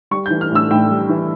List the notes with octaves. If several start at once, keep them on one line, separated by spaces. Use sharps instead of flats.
G3 C#6
G6
E3
F6
A2 E6
A2 G5
G3
E3